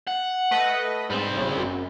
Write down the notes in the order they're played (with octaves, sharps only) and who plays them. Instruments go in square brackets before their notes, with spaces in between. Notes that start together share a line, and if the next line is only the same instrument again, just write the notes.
[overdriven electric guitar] F#5
[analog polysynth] A3 B4 D#5
[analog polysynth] G#2 [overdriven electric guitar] G3 C4
[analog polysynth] G1 C#3
F#2